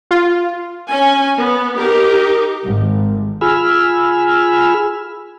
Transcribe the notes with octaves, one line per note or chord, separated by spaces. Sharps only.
F4
C#4 G#5
B3
D#4 G4 A#4
G#1
F4 G#4 G#5 B5 E6 F6